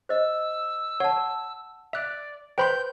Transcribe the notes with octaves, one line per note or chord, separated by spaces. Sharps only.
C5 D#5 E6
C#5 F#5 A5
D5 E5 F#6
B4 C5 G5 B5 C6 G6